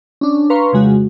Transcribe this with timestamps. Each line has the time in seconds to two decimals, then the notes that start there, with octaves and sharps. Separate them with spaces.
0.21 C#4 D4
0.50 B4 F5 A#5 C6 C#6
0.73 F2 C#3 G#3 F#4